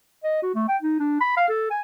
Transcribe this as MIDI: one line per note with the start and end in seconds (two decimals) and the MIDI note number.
0.24 0.39 75
0.42 0.50 66
0.55 0.67 57
0.68 0.76 79
0.82 0.95 63
1.00 1.16 62
1.21 1.34 83
1.37 1.46 77
1.49 1.68 69
1.70 1.81 80